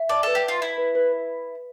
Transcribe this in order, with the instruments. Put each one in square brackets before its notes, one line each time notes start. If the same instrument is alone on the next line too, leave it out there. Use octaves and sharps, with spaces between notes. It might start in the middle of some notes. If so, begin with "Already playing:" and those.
Already playing: [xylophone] E5
[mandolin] D5 [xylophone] A5
[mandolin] A4 [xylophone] B4
[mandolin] G4
[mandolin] F4 [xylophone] B4
[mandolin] E4 [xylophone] E5
[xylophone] B4
B4
B4